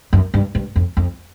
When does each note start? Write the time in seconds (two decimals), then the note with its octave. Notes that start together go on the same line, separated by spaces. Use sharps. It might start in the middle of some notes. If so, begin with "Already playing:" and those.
0.13 F#2
0.34 G2
0.55 G2
0.76 F2
0.97 F2